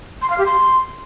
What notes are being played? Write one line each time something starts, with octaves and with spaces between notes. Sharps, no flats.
C6
F5
G4
C6